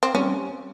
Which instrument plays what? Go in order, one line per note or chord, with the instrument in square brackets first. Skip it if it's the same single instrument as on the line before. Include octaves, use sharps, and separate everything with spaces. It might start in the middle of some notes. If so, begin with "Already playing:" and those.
[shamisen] C4
[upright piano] G3 C4 G4 [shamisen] C#4